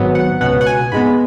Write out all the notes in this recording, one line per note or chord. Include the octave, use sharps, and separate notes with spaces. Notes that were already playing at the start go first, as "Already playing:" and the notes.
Already playing: G#1 G#2 F#3 B3
F#5
C#2 B2 B3 F#5
F#5
G#5
G#2 G#3 B3 B5